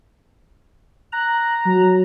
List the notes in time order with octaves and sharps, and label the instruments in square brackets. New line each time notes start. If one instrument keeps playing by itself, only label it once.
[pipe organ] A#5 [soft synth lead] F#6
[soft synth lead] F#3